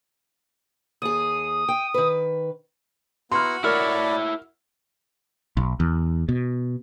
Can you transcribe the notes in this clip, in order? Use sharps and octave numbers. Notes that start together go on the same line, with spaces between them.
D#2 G#4 D#6
G5
D#3 B4
B3 E4 F#4 A#5 C6 F6
E4 A#4 C#5 D5 B5 F6
B1
E2
B2